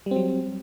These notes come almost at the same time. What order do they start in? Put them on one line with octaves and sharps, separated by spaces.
G3 C4 F#3